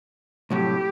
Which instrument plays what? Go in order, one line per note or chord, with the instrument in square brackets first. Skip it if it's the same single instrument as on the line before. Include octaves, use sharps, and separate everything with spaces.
[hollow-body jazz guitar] C2 A2 F#3 [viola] G4